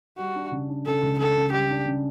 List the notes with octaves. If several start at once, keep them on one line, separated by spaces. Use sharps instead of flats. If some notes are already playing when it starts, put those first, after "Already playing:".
G3 F#4
D4
C#3
D4
C#3 A4
C#2
C#3 A4
C#3
G3 G4
D4
C#3